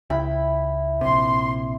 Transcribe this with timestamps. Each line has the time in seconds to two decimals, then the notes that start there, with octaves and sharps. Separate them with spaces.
0.10 C#2 E4 G5 B5
1.01 A#1 C3 C6